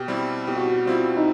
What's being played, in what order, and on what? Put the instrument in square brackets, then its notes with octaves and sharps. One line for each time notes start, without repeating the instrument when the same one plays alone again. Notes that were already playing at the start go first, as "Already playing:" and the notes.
Already playing: [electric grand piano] B2 [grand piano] G4
[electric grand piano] G3 C4 E4
[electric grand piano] B2 [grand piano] G4
[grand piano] F#4
G4
[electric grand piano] G3 C4 E4 [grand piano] F4
[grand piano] D#4